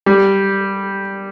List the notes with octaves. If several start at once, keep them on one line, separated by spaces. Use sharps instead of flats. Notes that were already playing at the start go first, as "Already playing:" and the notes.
G3